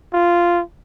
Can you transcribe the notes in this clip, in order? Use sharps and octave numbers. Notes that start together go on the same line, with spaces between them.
F4